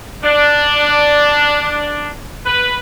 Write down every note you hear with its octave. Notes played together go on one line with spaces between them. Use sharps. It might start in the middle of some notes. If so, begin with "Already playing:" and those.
D4
B4